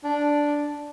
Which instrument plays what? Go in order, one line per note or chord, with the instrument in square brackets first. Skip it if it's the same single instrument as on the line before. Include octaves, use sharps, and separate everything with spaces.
[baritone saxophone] D4